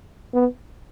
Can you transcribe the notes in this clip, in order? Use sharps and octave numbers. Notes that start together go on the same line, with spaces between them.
B3